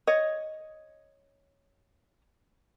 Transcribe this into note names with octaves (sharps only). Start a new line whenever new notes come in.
C#5 D#5